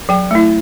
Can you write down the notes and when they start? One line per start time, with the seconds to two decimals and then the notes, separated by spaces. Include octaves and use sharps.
0.09 F#3 G5
0.31 A3 E4